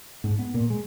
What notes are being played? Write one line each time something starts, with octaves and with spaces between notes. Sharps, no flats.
G#2
B3
A#2
G#3